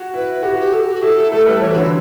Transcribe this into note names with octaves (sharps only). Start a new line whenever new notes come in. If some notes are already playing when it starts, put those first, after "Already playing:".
Already playing: F#4
E4 B4
F#4 G4
G4
A4
G4
F#4
E4 A4
A3 A4
G3 B4
E3 C#5
F#4
D3 E4